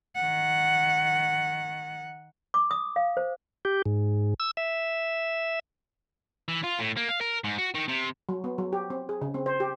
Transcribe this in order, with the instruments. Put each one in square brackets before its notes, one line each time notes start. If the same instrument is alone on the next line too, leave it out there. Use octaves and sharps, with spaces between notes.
[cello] D#3 F#5
[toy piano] D6
D#6
F5
C5
[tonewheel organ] G4
G#2
E6
E5
[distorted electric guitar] E3
F4
A2
A#3
F5
A#4
G#2
F#4
D#3
C3
[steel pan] F#3
B3
F#3
G4
C4
G#4
C#3
C4
C5
G4